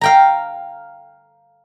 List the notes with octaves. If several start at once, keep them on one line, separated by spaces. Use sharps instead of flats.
F5 G5 A#5